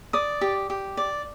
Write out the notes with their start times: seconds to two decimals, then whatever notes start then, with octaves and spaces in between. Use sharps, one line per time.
0.13 D5 D#6
0.41 G4
0.70 G4
0.97 D5